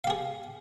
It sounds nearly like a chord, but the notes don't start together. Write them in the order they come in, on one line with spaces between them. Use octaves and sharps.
F5 G4 G#4